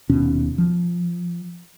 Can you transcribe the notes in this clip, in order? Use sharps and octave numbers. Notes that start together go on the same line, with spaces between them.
D#1 D#2 B2 C#4
F3